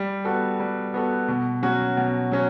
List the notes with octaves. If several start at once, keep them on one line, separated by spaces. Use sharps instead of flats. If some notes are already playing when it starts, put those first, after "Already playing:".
Already playing: G3
B3 F#4 A4
G3
B3 F#4 A4
B2
F#3 C#4 F#4
B2
F#3 C#4 F#4